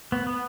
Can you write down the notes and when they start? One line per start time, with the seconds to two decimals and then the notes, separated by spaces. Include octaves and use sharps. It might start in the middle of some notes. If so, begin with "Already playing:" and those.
0.12 B3
0.27 B3